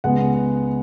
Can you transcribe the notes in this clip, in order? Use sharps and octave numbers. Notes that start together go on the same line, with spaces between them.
C#2 C#3 G#3 B3 F#5